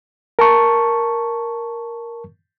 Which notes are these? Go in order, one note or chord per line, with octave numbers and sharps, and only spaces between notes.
A#4 A5 C#6